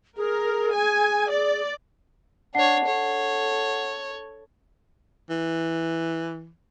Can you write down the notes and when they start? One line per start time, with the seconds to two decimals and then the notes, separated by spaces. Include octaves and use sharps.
0.17 G#4 A#4
0.73 G#5
1.30 D5
2.55 D4 C#5 F#5 C7
2.85 A4 C#5
5.30 E3